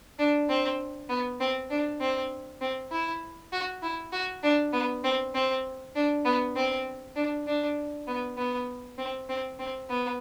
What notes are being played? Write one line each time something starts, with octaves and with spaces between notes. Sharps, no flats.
D4
C4
B3
C4
D4
C4
C4
E4
F#4
E4
F#4
D4
B3
C4
C4
D4
B3
C4
D4
D4
B3
B3
C4
C4
C4
B3